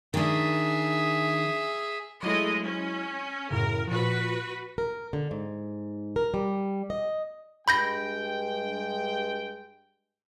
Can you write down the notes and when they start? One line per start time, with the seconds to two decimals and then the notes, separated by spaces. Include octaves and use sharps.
0.14 D#3 D4 G#4 E5
2.23 F#3 G#3 A3 E4 D#5
2.62 C#4
3.51 F#2 A2 C#3 A#4
3.87 A#2 F3 F#4 B4
4.78 A#4
5.13 D3
5.31 G#2
6.16 A#4
6.34 G3
6.90 D#5
7.68 G2 G#3 G5 B5 G6 A#6